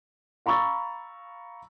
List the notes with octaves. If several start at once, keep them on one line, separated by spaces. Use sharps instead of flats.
F5 A#5 B5 C#6 E6 A6